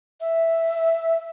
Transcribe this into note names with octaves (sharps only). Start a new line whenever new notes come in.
E5